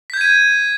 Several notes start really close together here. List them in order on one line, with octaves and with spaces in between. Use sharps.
B6 G6 G#6 D#7